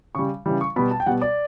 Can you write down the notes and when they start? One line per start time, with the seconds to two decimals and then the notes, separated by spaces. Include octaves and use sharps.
0.15 C#3 G3 C#6
0.46 C#3 E3 G3
0.61 C#6
0.76 B2 G3 B5
0.91 A5
1.00 G5
1.06 B2 G3 F#5
1.21 D5